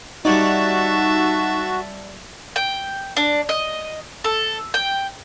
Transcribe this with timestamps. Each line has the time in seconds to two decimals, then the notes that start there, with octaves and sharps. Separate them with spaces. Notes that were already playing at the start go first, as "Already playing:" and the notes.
0.25 G3 D#4 F#4 C#5 D5 E5 A5
2.56 G5
3.17 D4
3.49 D#5
4.24 A4
4.74 G5